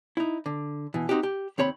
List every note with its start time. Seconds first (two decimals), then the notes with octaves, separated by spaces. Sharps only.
0.17 D#4 E4
0.46 D3
0.94 B2 E3
1.09 C4 D#4 F#4 G4
1.23 G4
1.58 D#2 C4 C#5 B5